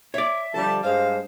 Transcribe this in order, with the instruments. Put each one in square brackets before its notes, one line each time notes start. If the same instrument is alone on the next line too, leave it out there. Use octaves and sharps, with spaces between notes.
[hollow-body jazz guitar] C#5 D5 [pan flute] E5
[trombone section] D3 F3 G3 [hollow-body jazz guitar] A4 [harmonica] A5
[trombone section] G2 G#3 [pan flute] C5 [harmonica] F5